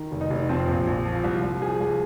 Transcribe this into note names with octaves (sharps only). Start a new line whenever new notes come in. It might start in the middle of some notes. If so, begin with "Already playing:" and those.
Already playing: D#3
F1
D#4
F1
F3 C4
A#1
A#1
F3
C2
C2
F3 G#4
C2